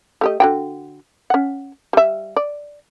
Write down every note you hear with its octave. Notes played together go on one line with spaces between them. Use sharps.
A3 G4 D#5
D3 F#4 G5
C#4 F#5
G3 E5
D5